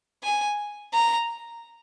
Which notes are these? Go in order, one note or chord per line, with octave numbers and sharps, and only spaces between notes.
G#5
A#5